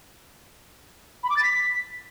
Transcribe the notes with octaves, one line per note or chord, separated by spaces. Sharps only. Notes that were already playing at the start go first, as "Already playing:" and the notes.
B5
D6
A6
B6